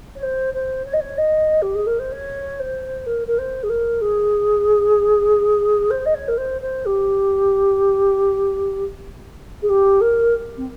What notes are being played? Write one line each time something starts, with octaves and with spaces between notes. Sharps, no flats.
C#5
C5
C5
C#5
D#5
C#5
D#5
G4
G#4
A#4
C5
C#5
C5
A#4
A#4
C5
G#4
A#4
G#4
C5
D#5
C#5
A#4
C5
C5
G4
G#4
G4
A#4
C4